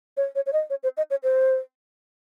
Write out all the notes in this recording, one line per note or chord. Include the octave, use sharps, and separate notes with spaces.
C#5
C#5
C#5
D#5
C#5
C5
D#5
C#5
C5